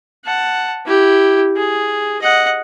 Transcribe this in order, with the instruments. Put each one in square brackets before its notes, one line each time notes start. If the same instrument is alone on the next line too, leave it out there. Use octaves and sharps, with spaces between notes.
[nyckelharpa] F#5 A5
E4 G4
G#4
D#5 F#5